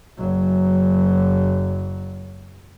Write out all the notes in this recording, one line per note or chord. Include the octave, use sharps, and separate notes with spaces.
F#1 F#3